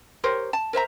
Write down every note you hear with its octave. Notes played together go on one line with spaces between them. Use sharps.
G4 A#4 C5 C#5
A5
A#4 C5 E5 A#5